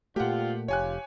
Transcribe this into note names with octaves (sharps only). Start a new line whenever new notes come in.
A#2 A3 C4 D4 F4 G4 F#5
F1 F4 G4 C#5 G#5 F#6